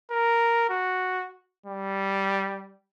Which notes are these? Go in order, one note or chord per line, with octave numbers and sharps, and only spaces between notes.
A#4
F#4
G3